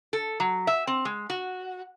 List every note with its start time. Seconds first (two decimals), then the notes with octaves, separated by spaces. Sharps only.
0.13 A4
0.40 F#3
0.67 E5
0.87 C4
1.05 G#3
1.30 F#4